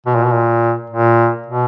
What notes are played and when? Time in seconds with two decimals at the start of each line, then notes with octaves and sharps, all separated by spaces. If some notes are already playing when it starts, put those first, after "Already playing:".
0.06 B2
0.15 A#2
0.25 B2
0.33 A#2
0.90 A#2
1.46 B2